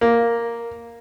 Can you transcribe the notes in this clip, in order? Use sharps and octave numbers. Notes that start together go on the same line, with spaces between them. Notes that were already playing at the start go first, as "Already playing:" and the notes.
A#3